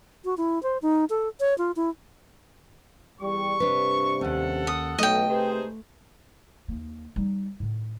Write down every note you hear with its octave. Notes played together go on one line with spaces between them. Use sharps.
F#4
E4
C5
D#4
A4
C#5
F4
E4
E2 G3 C#6
G2 C3 D4 B4
D#2 C#4 A4 F#5
D#6
B1 A3 D#5 G5
C3 D#4 G#4 B4 C5
D#2 A#3
G3 D#4
A2 D#3